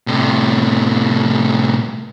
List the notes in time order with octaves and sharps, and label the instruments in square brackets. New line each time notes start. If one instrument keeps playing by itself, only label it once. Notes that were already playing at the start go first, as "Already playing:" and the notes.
[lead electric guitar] A2 C3